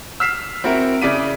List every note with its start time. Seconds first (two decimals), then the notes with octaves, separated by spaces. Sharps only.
0.20 E6 F6 B6 C7 E7
0.64 C4 E4 F#4 A#4
1.02 C#3 E4 D5 B6 D#7